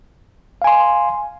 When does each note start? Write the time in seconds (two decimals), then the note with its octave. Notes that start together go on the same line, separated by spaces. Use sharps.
0.62 F5
0.64 G#5
0.67 C6